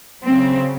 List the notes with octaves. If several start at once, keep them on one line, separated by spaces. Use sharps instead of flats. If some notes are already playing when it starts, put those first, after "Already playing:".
C#3 F#3 C4